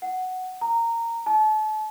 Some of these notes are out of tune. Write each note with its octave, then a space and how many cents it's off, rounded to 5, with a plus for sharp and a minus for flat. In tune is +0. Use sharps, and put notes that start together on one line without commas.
F#5 +0
A#5 -15
A5 -35